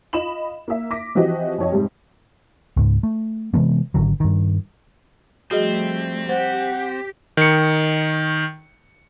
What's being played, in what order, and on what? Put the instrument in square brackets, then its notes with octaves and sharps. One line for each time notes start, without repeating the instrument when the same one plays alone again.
[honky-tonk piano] F4 D#5 B5 E7 F#7
A#3 E5
D6 A#6 B6
E3 F3 C4 F#4 G4 D#5
F2 C#5 D#5
G#2 C3 G3
[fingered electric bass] C#2 G#2
A3
C3 E3 G#3 B3
G#1 D3 F#3
G2 D#3
[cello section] F3 G3 A3 [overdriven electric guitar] C4 [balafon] F#4 G#4 D#5
[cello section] G4 [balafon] C5 [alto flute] F#5
[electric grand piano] D#3 C#7